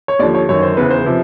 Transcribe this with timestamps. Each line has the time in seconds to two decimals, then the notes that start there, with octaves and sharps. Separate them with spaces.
0.08 C#5
0.19 D#2 D3 F3 D5
0.35 C#5
0.49 F#2 D#3 C#5
0.63 C5
0.77 E2 C#3 E3 B4
0.91 C5
1.06 C3 F3